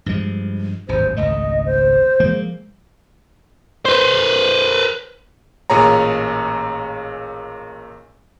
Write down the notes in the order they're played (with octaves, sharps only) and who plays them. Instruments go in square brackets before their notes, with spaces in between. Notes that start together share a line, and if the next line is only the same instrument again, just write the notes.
[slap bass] G2 F3 G#3
[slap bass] D1 G#1 G2 [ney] C5
[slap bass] G#1 C#2 A3 [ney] D#5
[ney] C5
[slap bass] F3 G#3 A#3
[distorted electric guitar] B4 C5
[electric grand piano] A1 A#2 G#4 C#5 A#5